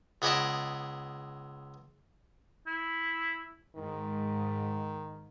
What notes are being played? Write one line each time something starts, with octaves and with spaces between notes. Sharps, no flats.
C#2 B3 G#4 D5 D#5 A5
E4
G#2 D#3